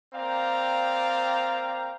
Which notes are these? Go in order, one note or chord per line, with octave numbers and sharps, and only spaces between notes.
A#3 C4 D5 F5 G5 A#5